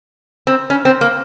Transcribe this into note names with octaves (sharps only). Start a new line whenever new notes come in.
C4
C#4
C4
A#3